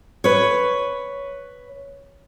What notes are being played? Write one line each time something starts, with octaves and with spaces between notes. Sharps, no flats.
B4 C#5